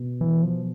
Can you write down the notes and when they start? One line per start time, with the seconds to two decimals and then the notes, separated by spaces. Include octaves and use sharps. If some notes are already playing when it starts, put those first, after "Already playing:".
Already playing: B2
0.21 E3
0.42 F3